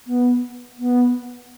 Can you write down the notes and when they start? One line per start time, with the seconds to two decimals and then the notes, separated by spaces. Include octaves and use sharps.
0.06 B3
0.79 B3